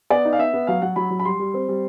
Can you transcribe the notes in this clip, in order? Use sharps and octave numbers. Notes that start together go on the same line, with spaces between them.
B3 D5
D#4
F5
B3 E5
B3
F#3 F5
F#3 F#5
F#3 B5
F#3
B5
G3 C6
G3
C4
G3